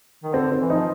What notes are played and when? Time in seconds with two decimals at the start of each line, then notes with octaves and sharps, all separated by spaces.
0.24 D#3
0.34 D3 C4
0.52 C4
0.60 E3
0.70 F3 D#4